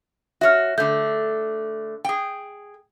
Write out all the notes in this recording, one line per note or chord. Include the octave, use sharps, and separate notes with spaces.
F#4 C#5 E5 F6
D3 A3 G6
G#4 G5